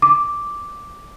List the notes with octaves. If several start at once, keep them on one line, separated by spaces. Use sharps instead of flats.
D6